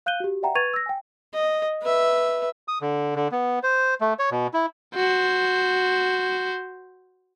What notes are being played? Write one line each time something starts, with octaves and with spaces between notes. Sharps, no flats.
F5 F#6 G6 D#7 G7
F#4 G4
D5 E5 F#5 G5 A#5
B4 C#6 G#6 A6 D#7 F7
E6 A#6
G5 G#5
D#5
B4 E5
D#6
D3
D3
B3
C5
A3
C#5
B2
E4
F#4 C5